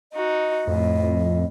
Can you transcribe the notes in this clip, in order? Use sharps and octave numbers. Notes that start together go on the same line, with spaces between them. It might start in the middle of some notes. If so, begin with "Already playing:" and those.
D#4 F#4 D#5
F2 A2